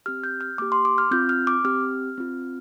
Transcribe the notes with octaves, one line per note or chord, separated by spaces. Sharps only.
C4 G4 F6
G6
F6
A#3 G4 D6
C6
D6
F6
C4 F4 G6
F6
D6
C4 G4 F6
C4 F4